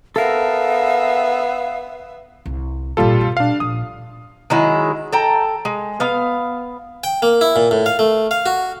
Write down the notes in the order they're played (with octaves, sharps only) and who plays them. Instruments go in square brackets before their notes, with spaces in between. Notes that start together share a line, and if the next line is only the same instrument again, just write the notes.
[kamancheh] B3 E5 [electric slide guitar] A4 A#4 [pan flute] F5
[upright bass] C2
[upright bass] G#1 A#2 [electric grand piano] G3 F4 A4
[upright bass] B2
[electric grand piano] D4 F5
[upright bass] A#1 [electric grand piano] D#6
[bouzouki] D#3 F#3 G#3 E4
A4 G5 A#5
G#3
B3 F5
[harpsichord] G5
A#3
E4
A#2
A2
F5
A3
F5
F#4